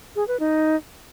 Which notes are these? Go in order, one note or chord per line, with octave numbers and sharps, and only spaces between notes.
G#4
B4
D#4